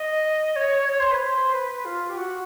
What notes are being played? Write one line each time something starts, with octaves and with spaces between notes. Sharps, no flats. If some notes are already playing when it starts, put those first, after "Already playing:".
Already playing: D#5
C#5
C#5
C5
B4
C5
B4
F4
G4
F#4